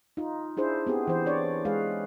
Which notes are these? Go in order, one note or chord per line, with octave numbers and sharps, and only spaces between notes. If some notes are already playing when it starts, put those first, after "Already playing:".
D#4 F4
D4 E4 G#4 C5
B3 C4 G4 G#4
E3 C5
D4 C#5 D5
G#3 G#4 B4 F5